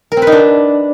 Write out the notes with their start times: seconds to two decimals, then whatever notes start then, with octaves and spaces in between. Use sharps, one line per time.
0.12 A#4
0.17 C4
0.22 B4
0.27 D#4
0.32 D4